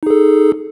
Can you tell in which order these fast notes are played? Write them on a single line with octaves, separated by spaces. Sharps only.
D#4 G#4 A4